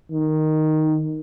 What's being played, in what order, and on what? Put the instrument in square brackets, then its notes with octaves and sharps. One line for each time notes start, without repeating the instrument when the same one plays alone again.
[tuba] D#3